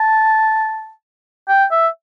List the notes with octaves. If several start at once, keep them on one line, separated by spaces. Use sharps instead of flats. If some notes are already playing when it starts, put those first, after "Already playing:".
Already playing: A5
G5
E5